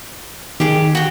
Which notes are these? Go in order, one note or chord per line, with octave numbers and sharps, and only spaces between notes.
D#3 G4 G#4
F#4 G5